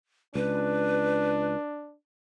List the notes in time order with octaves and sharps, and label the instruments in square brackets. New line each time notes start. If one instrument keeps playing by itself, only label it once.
[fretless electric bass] C#2 [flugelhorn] D4 [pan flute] B4